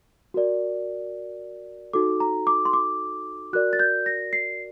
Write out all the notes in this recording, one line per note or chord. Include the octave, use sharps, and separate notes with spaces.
F#4 A#4 D5
D#4 F#4 A4 D6
A#5
D6
C6
D6
F#4 A#4 D5 F#6
A6
G6
A#6
C7